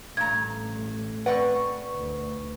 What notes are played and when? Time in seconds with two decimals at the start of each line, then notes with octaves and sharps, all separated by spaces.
0.17 A1 G2 A3 A#5 G#6
1.26 C4 B4 D5 F#5 C#6
1.96 D2